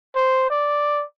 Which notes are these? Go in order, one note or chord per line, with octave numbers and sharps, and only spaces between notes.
C5
D5